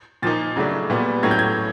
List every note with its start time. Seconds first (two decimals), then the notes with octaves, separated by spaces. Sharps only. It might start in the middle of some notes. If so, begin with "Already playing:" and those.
0.22 A#2 F3 A#3 D#4 A6
0.56 C#3 F#3 A3 D4
0.90 A#2 G3 B3
1.23 A2 F#3 A3 C#4 G#6
1.31 G6
1.39 G#6